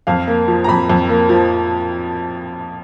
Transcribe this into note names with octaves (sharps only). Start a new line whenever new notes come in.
F2 F5
A#3
F3
A#5
F2 B5
F2
A#3
F3